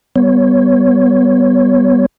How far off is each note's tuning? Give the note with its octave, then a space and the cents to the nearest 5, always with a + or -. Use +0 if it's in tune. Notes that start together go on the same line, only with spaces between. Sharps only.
G3 -10 B3 +5 C#5 +0